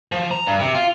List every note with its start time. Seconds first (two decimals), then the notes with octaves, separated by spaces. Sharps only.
0.12 F3
0.31 A#5
0.46 G2
0.60 C3
0.74 F4